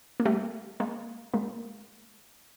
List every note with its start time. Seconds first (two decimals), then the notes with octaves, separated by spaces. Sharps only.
0.20 A#3
0.25 G3 A3
0.80 G#3 A#3
1.34 G#3 A#3